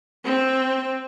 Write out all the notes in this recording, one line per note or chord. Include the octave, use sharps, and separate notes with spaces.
C4